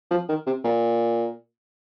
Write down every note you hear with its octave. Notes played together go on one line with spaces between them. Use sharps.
F3
D#3
C3
A#2